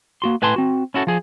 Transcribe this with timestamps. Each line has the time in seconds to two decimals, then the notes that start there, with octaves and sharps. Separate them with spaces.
0.22 A#3 F#4 C6
0.42 A2 B4 G#5 A5 C6
0.56 C4 F#4
0.94 C#4 E4 F#4 A4
1.07 F3 G#4